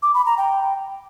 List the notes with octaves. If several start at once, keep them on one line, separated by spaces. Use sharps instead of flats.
D6
B5
A#5
G5